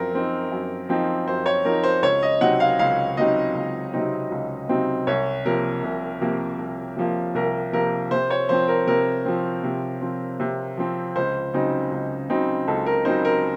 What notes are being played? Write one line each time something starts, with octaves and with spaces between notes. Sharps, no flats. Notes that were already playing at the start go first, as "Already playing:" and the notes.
Already playing: F#2 F3 C4 A#4
F3 C4 D#4
F#2
F3 C4 D#4
F#2 C5
C#5
F3 C4 D#4 A#4
C5
C#2 C#5
D#5
C3 F#3 C4 D#4 F#5
F5
C#2 F5
C3 F#3 C4 D#4 D#5
C#2
C3 F#3 C4 D#4
C#2
C3 F#3 C4 D#4
C2 C#5
C3 F3 A#3 A#4
C2
C3 F3 A#3
C2
C3 F3 A#3
C2 A#4
C3 F3 A#3 A#4
C3 C5
C#5
F3 C4 C5
A#4
C3 A#4
F3 C4
C3
F3 C4
C3
F3 C4
C#2 C5
C#3 F#3 C4 D#4
C#2
C#3 F#3 C4 D#4
C#2 A4
A#4
C#3 F#3 C4 D#4 C5
A#4